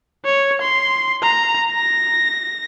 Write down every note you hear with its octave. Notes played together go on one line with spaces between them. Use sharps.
C#5
C6
A#5
A#6